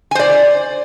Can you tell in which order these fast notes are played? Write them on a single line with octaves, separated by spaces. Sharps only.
G#5 C5 D5